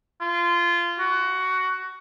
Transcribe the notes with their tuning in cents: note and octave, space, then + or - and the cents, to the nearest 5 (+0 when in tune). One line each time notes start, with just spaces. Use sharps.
F4 -20
F#4 +15